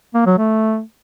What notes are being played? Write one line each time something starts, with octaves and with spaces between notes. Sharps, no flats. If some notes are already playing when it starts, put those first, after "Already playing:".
A#3
F#3
A3